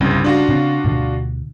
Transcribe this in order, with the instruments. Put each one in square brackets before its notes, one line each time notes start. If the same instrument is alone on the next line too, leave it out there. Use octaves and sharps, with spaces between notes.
[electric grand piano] G1 C2 [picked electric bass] C#3 G3 C#4
[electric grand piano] D4 F4 F#4
[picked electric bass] C#3 C4
D2 B2 D3